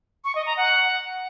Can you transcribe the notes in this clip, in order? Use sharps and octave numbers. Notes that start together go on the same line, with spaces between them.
C#6
D#5
A#5
F#5